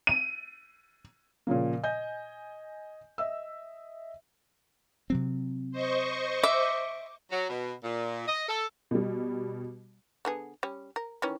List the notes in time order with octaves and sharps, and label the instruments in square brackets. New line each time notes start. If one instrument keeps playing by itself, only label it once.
[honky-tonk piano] D#7
[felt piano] A#2 C#3 F3 A#3
D#5 G#5 G6
D#5 E5 E6
[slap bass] C3 F#3 C4
[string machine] C5 D#5 C#6
[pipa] E5 [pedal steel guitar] D6
[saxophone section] F#3
B2
A#2
D#5
A4
[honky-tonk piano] B2 G3
[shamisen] D3 B3 G#4
G3 C#4
A#4
D#3 E3 C#4